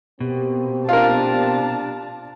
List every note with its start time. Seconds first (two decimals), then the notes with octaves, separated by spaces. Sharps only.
0.20 B2 A#3 C4 G4
0.89 D4 F4 A#4 A5